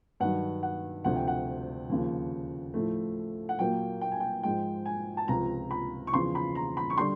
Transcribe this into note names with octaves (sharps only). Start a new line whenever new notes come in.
G2 D#3 F#3 F#5
F#5
D2 C3 F3 F#5
G5
F#5
D#2 C#3 F3
A2 F3 A3
F#5
A#2 F#3 A#3 G5
G5
G#5
G5
G#2 F3 G#3 G5
G#5
A5
C#2 C3 F3 A#5
B5
C#6
E2 C#3 F3 C6
B5
A#5
B5
C#6
D3 G3 C6